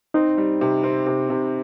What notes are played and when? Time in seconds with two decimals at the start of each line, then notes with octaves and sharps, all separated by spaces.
0.14 C4 D#4
0.38 G3
0.61 C3
0.83 C4
1.06 C3
1.30 C3